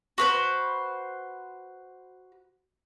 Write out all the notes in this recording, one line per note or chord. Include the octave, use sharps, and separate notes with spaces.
F#4 B4 C5